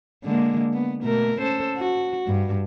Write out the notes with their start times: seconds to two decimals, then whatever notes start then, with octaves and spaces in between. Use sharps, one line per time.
0.24 D3 G#3 A#3
0.74 B3
1.03 B2 A3 A#4
1.39 C#4 A4 C5
1.77 F#4
2.27 G2